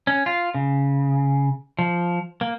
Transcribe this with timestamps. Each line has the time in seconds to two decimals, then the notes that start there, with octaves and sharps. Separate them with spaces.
0.07 C#4
0.26 F4
0.54 C#3
1.79 F3
2.41 A#3